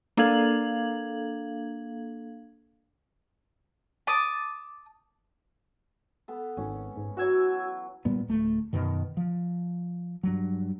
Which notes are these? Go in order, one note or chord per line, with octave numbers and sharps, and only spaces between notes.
A#3 D4 A4 F5 G#6 F#7
A5 D6 D#6
B3 A4
G#1 C#4
G#2
E3 F#3 F#4 E6 G#6
A#2 G3 B3
D1 A3
F#2 B2 D#3
F3
G2 F#3